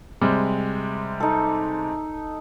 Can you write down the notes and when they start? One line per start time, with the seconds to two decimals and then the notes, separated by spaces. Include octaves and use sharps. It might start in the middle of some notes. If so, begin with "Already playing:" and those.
0.21 C3 G3 G#3
1.20 D#4 A4